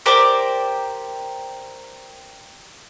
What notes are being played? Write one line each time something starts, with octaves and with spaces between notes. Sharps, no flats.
G4 A#4 C5 D5